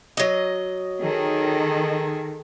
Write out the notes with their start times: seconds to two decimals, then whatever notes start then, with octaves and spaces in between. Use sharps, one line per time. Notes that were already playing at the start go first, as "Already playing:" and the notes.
0.17 F#3 D#5
1.01 D#3 G#4 A4